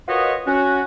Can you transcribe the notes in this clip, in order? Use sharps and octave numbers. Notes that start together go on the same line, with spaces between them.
F4 F#4 A#4 B4 C#5 D#5
C#4 F#4